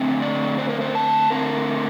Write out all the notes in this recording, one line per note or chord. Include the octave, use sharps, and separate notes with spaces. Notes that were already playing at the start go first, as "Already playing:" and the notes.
Already playing: D3 A3 C4
D5
C5
A#4
C5
A5
D3 A3 C4 A#4